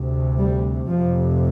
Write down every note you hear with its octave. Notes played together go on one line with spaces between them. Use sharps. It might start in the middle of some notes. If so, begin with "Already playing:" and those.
Already playing: D2 C3
G3
F1 F2 C3 F3